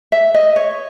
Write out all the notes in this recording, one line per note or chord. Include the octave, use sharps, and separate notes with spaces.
E5
D#5
C#5